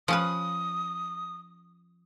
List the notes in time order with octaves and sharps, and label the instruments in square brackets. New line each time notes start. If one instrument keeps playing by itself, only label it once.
[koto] F3 C#4 B4 [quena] D#6